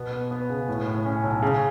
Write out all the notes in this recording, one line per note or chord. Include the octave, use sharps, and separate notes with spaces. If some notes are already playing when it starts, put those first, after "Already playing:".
Already playing: B2 B3
B3
B3
C#3
A2
A2
C#4
B1
C#3